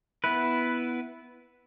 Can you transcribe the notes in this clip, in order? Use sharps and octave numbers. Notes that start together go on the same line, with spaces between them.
B3 E4 B4